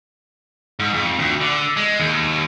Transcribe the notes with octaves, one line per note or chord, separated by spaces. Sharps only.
G#2
F2
D2
D3
G#3
D#2